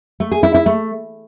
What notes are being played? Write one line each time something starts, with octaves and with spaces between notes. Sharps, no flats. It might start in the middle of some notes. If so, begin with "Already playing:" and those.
A3
G#4
E4
E4
A3